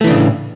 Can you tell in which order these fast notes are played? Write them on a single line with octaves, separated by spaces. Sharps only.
A3 E3 D4 C#3 A2